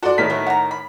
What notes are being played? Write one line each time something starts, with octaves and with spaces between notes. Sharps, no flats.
F#4 A4 D5 C6
A2 D#3 A#4 B6
F#3 A3 B3
F#5 A#5
B5